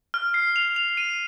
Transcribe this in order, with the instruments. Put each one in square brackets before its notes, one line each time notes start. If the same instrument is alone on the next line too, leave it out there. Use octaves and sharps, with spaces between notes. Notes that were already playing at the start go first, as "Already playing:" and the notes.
[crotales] F6
C7
F7
F7
D#7